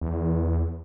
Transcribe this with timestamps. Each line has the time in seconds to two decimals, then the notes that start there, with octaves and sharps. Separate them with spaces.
0.01 E2